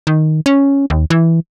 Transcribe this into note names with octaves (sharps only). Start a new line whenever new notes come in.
D#3
C#4
D#2
E3